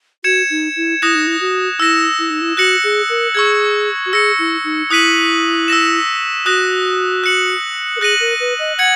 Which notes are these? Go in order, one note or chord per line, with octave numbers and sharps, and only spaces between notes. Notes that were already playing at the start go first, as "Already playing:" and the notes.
F#4 G#6 C#7 E7
D#4
E4
E4 D#6 F#6 A#6 E7
D#4
E4
F#4
E4 E6 A#6 E7
E4
D#4
E4
F#4 F#6 A#6 C#7 F#7
G#4
A#4
G#4 C#6 E6 G#6
F#4
G#4 E6 A#6 C#7
E4
D#4
E4 D#6 F#6 B6 D#7 F#7
E6 A#6 E7
F#4 D#6 F#6 A#6
F#6 C#7 F#7
A#4
G#4 F#6 A#6 D#7 F#7
A#4
B4
D#5
F#5 G#6 C#7 F#7